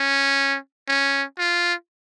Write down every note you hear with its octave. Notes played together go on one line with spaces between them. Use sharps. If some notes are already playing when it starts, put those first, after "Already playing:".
Already playing: C#4
C#4
F4